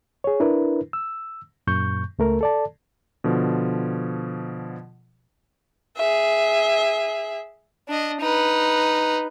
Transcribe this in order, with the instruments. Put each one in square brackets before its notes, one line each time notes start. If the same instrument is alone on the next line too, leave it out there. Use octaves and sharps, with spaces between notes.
[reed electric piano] G#4 C#5
D4 E4 A#4 B4
E6
F#2 A#2 C#6 G6
C#2 A3 A#4
A4 D5 A5
[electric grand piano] B2 D3 F3
[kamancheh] G#4 E5
[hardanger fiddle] D4 D#5
D#4 B4